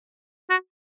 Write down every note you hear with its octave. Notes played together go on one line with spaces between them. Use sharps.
F#4